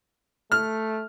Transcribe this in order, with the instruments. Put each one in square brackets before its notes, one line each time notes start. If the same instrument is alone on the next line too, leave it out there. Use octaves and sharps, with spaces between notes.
[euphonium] A3 [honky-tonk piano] F6